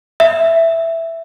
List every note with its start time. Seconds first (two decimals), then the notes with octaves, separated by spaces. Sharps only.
0.20 E5